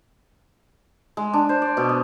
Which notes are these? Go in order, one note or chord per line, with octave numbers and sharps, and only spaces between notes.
G#3
D4
C5
D5
B2
D#5